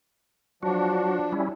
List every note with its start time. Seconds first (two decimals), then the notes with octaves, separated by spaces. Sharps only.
0.63 F3 F#3 D4 F#4
1.32 G3 C#4 E4